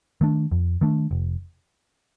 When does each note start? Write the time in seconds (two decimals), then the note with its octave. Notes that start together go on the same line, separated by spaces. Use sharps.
0.21 D#3 A3 D4
0.52 F2
0.81 D#3 A3 D4
1.11 F1